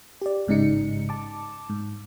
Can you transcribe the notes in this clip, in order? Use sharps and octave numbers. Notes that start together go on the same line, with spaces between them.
G4 D5
A1 G#2 C#3 D#4 C#7
A5 D6
G#2